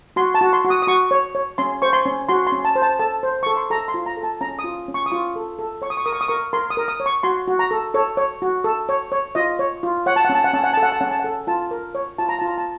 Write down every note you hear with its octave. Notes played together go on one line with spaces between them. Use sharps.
F#4 C6
A5
F#4
C6
F#4
D#6
D#6
F#4 C#6
C#5
C#5
C#4 C6
C5 C#6
C6
C#4
F#4 C6
C6
C#4
A5
C5
A5
A4 A5
C5
A4 C#6
C6
A4 A#5
C6
F4
A#5
A4
A5
C#4 A#5
D#6
F4
C#4
C#6
D#6
F4 C#6
A4
A4
C#5 C#6
D#6
C#6
A#4 D#6
C#6
D#6
A#4 C#6
A#4 C6
D#6
A#4
D#6
C#5
C#6
F#4 C6
F#4
A#5
A4
A4 C#5
C#5
F#4
A4
C#5
C#5
F4 D#5
C#5
F4
C#5 F#5
A5
F#5
C#4
A5
F#5
C#4 A5
F#5
A4 A5
F#5
A5
C#4 F#5
A5
A4 F#5
F4 A5
A#4
C#5
F4 A5
A#5
F4 A5
A#5
A5